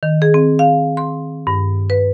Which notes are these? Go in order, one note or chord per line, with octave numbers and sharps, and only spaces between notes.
D#3
G#4
C4
F5
C6
G2
B4